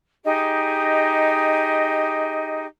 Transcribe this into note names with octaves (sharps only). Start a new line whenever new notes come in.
D#4 G4 G#4 D#5